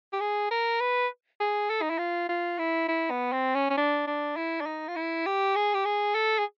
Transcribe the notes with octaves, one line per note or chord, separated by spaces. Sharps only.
G4
G#4
A#4
B4
G#4
A4
D#4
E4
F4
F4
E4
E4
B3
C4
C#4
C#4
D4
D4
E4
D4
D#4
F4
E4
G4
G#4
G4
G#4
A4
G#4